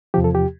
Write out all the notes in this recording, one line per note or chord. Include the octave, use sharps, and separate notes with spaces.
E2 C3 F3 G4
A4
G4